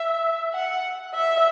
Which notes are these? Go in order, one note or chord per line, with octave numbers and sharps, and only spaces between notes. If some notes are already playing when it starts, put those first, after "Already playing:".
Already playing: E5
F#5
E5